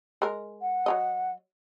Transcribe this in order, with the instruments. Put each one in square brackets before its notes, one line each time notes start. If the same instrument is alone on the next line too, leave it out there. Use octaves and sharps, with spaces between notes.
[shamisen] G#3 A#4
[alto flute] F#5
[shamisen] F#3 C#5 D#5